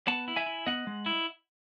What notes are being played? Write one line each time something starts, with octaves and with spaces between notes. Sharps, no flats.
B3 F#5 A5
E4
E5 G#5
E4
B3 D#5 F#5
G#3
E4